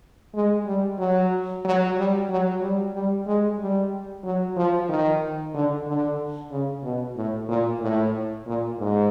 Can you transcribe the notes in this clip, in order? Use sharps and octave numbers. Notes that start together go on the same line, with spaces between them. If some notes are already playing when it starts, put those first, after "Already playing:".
G#3
G3
F#3
F#3
G3
F#3
G3
G3
G#3
G3
F#3
F3
D#3
D3
D3
C#3
B2
A2
A#2
A2
A#2
G#2